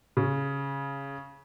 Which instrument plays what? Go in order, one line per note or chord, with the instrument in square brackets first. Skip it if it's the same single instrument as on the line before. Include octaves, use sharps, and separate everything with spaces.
[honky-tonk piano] C#3